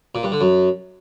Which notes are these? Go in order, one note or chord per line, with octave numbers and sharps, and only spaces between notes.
A#2
G2
D3
F#2